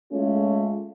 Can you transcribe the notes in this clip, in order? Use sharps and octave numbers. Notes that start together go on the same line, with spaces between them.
G#3 A3 C#4 F4